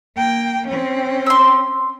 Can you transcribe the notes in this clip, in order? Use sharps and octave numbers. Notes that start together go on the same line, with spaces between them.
A#3 G5
C4 C#4
C6 E6